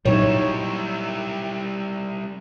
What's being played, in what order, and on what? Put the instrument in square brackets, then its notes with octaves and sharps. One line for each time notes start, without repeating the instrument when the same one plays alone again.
[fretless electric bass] A#2 F#3 [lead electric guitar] G3 E4 [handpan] D#4 C#5